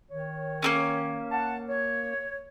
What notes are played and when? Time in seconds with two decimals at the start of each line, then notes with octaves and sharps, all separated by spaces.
0.11 D#3 C#5
0.62 A#3 C4 C#4
1.32 F#5 A5
1.69 C#5